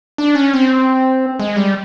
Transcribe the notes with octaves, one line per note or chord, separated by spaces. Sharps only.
D4
C#4
C4
G#3
G3